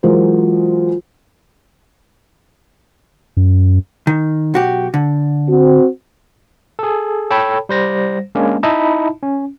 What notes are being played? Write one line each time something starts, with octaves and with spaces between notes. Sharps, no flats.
E3 F#3 G#3 F4 A#4 C5
F#2
D#3
B1 F#4 G4
D3
C4 F#4
G#4 A4
A4 C#5 G5 A5 B5
G3 C5 A#6
G#3 A#3 C#4 D4
D#4 E4 D#5 E5 A5 B5
C#4